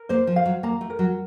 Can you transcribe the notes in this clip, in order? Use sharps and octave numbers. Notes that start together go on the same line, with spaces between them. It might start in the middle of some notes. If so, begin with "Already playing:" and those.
Already playing: A#4
A#3 C5
F3
F5
F#3
A#3 A#5
A3
A#4
F#3